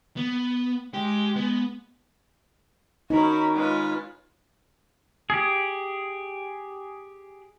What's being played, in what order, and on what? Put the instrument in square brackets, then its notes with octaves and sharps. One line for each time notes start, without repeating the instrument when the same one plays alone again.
[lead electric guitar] B3
[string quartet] G#3 [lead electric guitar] G4
[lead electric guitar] B3
[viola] C#4 F#4 [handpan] D#4 [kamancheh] A#4 B5
[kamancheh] G#3 B4 [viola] C#4 F4
[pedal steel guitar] G4 G#4